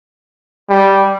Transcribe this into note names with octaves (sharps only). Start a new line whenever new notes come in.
G3